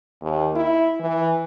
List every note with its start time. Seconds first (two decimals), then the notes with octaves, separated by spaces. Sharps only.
0.22 D#2
0.56 E4
1.00 E3